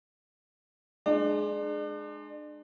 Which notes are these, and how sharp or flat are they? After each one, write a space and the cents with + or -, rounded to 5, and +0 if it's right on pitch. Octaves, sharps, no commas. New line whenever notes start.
G#3 +15 D4 +35